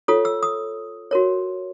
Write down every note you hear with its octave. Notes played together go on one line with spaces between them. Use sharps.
F4 A4 C#5 D#6
E6
D#6
F#4 A#4 C#5